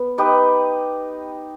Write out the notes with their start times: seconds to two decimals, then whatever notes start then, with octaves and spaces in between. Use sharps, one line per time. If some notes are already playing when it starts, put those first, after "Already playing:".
Already playing: B3
0.18 D#4 G4 B4 D#5